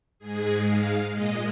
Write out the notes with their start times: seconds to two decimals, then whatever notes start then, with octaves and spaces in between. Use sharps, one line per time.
0.19 G#2 G#3 G#4
0.65 F5
1.09 A#2 G#3 D#5